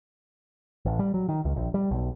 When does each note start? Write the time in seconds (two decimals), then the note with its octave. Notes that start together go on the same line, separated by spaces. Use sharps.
0.85 A1
0.99 G3
1.14 F#3
1.29 D#3
1.45 C#2
1.56 A#1
1.74 G3
1.91 B1